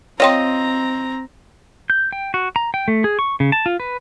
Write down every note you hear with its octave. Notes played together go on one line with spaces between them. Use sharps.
C4 F4 C#5 D#5 G5 A#5 C6
G6
G5
F#4
A#5
G5
A3
G#4
C#6
C#3
A5
F4
B4